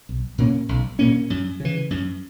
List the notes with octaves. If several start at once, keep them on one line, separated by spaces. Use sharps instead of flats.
B1
A#2 A#3 C#4
B1
A#2 A#3 C#4
F#2
C#3 E3
F#2